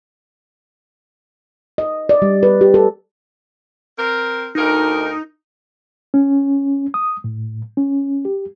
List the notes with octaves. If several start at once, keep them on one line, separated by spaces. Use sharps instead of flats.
D#5
D5
G3
B4
G4
A4
C4 A#4
D2 D#4 A#4
C#4
D#6
A2
C#4
G4